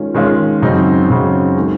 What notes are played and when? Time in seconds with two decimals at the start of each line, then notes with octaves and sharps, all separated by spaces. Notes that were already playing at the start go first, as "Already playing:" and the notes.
Already playing: D#3 G#3 C#4 F4
0.14 D#3 G#3 C#4 F4
0.62 F#2 C#3 F#3 C4 D#4
1.09 F#2 C#3 F#3 C4 D#4
1.57 D#3 G#3